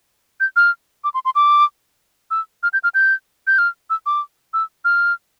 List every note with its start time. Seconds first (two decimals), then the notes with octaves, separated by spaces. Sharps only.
0.40 G6
0.56 F6
1.04 D6
1.14 C6
1.25 C6
1.35 D6
2.31 E6
2.63 F6
2.73 G6
2.84 F6
2.94 G6
3.47 G6
3.58 F6
3.90 E6
4.06 D6
4.53 E6
4.85 F6